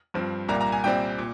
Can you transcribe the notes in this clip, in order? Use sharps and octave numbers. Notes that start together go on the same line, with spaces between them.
G2 F3 C4
C2 A#2 G3 A#3 A#5
A#5
G#5
C2 A#2 G3 C4 G5
A#2